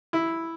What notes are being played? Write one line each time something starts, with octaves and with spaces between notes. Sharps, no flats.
E4